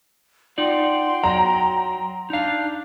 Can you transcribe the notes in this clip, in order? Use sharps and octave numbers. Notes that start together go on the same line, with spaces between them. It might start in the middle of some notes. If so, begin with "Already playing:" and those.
D#4 F4 D5 F#5 G5 C6
F#3 A#5
D4 D#4 F5